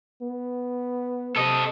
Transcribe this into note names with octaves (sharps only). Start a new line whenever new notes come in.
B3
C3 A4 D#5